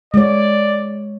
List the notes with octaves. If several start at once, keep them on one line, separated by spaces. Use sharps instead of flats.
G#3 C#5 D5